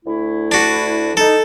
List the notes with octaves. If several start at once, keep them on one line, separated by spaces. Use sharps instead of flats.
D2 A3 E4
D4 F#4
D#4 A4